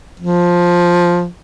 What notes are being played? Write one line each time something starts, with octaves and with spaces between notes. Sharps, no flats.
F3